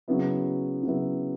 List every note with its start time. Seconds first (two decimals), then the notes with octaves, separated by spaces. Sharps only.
0.08 C#3 F#3 B3 E4
0.83 C#3 F#3 B3 E4